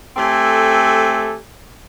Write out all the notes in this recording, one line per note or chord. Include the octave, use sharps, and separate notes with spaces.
A3 C4 G4 A4 G#5